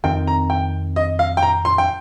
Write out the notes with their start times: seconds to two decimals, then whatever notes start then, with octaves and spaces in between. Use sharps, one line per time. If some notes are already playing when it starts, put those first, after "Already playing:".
0.04 F2 D#3 C4 G5
0.27 A#5
0.50 G5
0.96 D#5
1.19 F5
1.37 G5
1.43 A#5
1.65 C6
1.78 G5